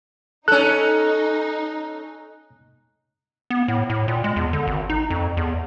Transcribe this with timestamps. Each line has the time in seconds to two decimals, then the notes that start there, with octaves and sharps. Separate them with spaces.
0.48 C#4 D#4 A4 F#6
3.50 B3
3.68 A2
3.90 A2
4.08 A#2
4.24 G#3
4.36 E2
4.53 D3
4.67 G#1
4.90 D#4
5.10 F2
5.37 E2